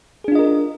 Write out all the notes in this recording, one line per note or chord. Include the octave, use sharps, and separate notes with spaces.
D4 F4 G#4 A#4 D#5